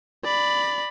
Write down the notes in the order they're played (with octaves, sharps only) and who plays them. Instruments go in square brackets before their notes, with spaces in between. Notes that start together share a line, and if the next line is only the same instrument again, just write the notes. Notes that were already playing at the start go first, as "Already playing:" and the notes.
[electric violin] D5 B5